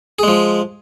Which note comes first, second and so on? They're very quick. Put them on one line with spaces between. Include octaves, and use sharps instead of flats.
G#4 G#3 F3